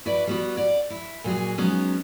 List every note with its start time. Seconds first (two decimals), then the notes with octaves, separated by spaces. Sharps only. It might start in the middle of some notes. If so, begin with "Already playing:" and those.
0.06 E4 F#4 B4 D5
0.27 G3 B3 F#4
0.57 D5 F#5
0.90 E4
1.24 A#2 F#3 F#4 G#4
1.58 F#3 G#3 B3 C#4 D#4